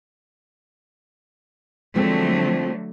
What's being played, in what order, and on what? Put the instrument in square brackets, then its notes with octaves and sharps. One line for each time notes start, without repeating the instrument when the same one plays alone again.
[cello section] D3 F#3 A3 [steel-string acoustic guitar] F3 G#3 C4